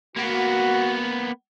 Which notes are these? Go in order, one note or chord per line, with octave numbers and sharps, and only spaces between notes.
A#3 B3 F#4